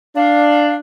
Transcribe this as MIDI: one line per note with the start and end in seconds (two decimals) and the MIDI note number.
0.16 0.77 62
0.16 0.75 77